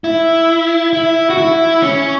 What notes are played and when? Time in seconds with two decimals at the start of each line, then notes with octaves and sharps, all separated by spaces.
0.04 E4
0.93 E4
1.30 F#4
1.38 E4
1.83 C#4